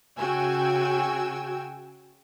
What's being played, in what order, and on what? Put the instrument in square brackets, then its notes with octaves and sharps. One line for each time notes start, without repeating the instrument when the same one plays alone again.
[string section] C#3 F#4 G5 G#5 E6